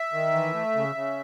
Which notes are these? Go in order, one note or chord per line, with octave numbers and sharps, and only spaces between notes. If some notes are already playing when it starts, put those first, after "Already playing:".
Already playing: E5
D#3
E3
A3
C#3
C#3